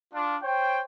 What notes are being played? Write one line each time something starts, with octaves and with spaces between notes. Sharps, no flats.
D4 F4
C5 C#5 G5